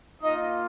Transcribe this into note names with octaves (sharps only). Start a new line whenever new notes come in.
A#3 D#4 F4 D#5